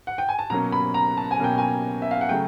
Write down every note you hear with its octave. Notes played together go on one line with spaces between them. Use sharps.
F#5
G5
G#5
A5
B2 F#3 A#3 C#4 A#5
B5
A#5
A5
G#5
B2 F#3 A#3 C#4 G5
G#5
E5
F5
F#5
C#3 F#3 A3 G5